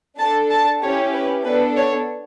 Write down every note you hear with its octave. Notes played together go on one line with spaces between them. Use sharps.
D4 A4 A5
A5
C#4 E4 G4 C#5
B4
B3 D4 A4 B4
C#5